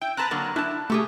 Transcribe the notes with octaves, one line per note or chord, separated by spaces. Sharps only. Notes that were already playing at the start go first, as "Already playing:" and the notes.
E4 G5
C4 B4 A5 A#5 F#6
D3 F#3 A#3
D4 E4 A5
B2 A3 G4 G#4